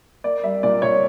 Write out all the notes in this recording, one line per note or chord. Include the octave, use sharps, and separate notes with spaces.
A#3 D5
G3 E5
A#2 D5
A#2 C#5